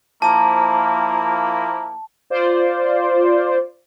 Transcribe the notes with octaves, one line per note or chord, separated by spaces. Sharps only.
F3 A#3 E4 A5 A#5 D6
F4 C5 D5